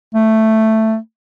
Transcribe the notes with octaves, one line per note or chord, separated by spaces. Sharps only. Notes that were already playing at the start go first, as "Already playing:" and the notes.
A3